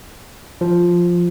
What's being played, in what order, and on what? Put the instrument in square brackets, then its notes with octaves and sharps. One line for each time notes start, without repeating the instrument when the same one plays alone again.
[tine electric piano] F3